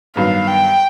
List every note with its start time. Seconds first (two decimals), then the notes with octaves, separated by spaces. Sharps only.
0.16 G2 D#3 F#3 B3 F5
0.47 G5